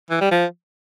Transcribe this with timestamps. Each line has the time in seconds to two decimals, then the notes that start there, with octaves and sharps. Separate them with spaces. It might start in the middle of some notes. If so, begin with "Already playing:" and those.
0.11 E3
0.21 G3
0.31 F3